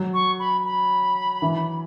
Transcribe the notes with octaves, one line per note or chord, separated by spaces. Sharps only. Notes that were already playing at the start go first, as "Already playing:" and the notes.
Already playing: F#3
C#6
B5
B5
E3